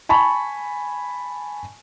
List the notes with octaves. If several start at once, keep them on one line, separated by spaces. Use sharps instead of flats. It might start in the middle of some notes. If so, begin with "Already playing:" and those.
G#5 A5 B5 C#6